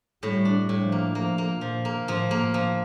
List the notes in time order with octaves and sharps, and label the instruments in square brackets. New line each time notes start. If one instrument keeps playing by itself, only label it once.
[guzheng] A2 [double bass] G3
[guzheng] D4
[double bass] G3
[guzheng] A2
[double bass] F3
[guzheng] A#3
[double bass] F3 [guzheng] A#3
[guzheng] A#3
[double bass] A#2 [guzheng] F3
[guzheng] A#3
[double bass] A2 [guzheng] F3
[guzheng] A#3
[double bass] A2
[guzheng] F3